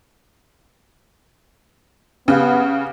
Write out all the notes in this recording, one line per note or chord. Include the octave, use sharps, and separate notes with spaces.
C#3 B3 G4 F5 F#5